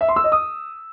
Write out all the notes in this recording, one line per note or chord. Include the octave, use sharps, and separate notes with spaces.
E5
C6
E6
D#5
D#6